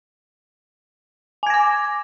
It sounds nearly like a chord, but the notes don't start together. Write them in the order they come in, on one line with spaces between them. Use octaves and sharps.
G#5 G#6 A#6 D6